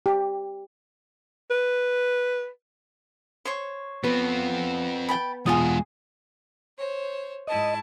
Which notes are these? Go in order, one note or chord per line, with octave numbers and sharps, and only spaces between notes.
G4
B4
C5 C#5 C#6
F3 B3 C4 B4
G5 A5 B5
E2 B2 G#3 F4 G#4 F#5 D#6
C5 C#5
G#2 E4 D#5 A5